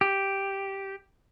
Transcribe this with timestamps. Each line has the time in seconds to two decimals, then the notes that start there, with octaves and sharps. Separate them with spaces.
0.01 G4